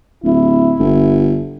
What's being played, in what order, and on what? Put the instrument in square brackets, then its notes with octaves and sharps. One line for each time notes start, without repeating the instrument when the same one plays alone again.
[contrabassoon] D1 [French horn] E4
[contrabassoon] G1